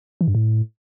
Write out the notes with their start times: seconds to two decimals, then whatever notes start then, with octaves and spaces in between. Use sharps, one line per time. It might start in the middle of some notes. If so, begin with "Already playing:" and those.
0.21 E3
0.28 G2
0.35 A2